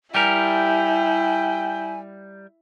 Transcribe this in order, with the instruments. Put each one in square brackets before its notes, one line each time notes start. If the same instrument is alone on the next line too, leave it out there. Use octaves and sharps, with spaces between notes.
[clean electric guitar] G3 G4 A#4 [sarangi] E4 [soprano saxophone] G5 [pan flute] G#5